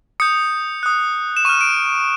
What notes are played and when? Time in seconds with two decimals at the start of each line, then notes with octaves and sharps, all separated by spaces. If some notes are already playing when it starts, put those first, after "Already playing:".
0.20 D#6 G6 C#7
0.83 D#6 F#6
1.37 E7
1.45 C#6 F6 D#7
1.61 D7